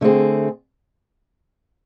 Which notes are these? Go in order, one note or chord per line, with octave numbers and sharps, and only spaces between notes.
D3 A3 C4 G#4